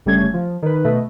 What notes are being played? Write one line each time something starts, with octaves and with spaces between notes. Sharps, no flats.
G1 C#3 G3 A3 C#4 G#6
F3
D#3 B4
B2 A3 B4 D#5